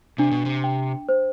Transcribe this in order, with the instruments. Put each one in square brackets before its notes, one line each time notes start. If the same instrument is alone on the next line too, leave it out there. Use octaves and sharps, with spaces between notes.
[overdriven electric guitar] C3 [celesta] D4
[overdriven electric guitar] B2
C3
[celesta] G5
C5